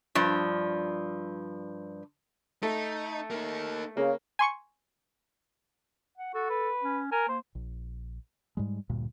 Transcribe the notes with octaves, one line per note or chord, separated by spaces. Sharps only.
G2 F3
A3 D#4
A#3 D#4
C#3 A#3
G#5 C6 C#6 C#7
F#5
F#4 A4
B4
C#4
A#4 G#5
A#3 C5
A#1
G#2 G3 G#3
D2 G2 A#2